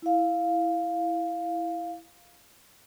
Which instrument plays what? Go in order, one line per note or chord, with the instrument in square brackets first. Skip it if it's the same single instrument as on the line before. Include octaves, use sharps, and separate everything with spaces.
[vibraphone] E4 F5